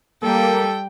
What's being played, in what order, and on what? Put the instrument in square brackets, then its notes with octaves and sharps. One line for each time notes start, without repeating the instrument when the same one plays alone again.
[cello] G3 [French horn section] A#3 [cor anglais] A4 [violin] G5